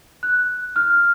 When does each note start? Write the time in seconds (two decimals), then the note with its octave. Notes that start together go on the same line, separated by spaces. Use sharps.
0.23 F#6
0.76 F6